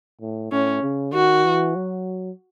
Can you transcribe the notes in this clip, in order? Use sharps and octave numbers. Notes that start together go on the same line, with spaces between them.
A2
A2 C#4
C#3
D#3 F#4
E3
F#3